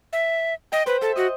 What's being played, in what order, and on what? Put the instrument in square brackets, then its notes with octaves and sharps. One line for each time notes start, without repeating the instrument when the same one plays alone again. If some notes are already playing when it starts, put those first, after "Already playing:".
[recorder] E5
[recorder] D#5 [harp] G5
[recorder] B4 [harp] C5
[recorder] A4 [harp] E5
[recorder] F#4 [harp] D#5